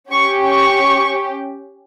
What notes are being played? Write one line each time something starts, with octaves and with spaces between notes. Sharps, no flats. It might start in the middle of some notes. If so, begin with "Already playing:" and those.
C#4 G4 C#6
C#6